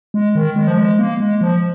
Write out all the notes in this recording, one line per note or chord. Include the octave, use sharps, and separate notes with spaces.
G#3
D#3
G#3
F3
G#3
A#3
G#3
F3